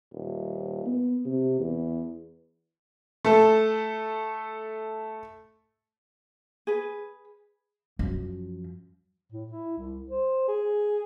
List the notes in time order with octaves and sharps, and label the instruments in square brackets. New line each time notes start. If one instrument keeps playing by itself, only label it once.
[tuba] D#1
B3
C3
E2
[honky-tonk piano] A3 A4
[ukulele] G#4 B4
[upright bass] F#2 F3
[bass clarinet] A2
E4
C2
C5
G#4